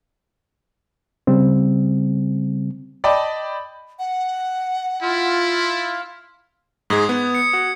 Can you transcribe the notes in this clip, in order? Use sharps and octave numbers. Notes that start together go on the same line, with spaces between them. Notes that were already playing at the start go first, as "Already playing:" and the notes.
C#3 G3 C4
D5 D#5 G5 A5 B5
F#5
E4 F4
G#2 G#3 D#6 G#6
B3
C#7
F#4